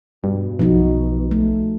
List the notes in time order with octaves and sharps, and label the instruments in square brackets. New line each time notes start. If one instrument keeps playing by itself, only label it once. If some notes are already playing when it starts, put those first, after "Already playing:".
[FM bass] G2 [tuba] B2
[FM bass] B1 [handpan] F3 D#4 F#4
[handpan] A3